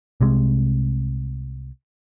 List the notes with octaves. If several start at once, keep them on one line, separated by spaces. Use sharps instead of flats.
C2 C3 G#3